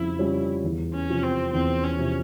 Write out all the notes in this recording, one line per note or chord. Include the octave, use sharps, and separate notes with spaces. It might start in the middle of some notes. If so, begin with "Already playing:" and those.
Already playing: F2 C#3 G3 E4
C#3 G3 C#4 F4
E2
C#4
C3 F3
C4
E2 C4
C#4
C3 F3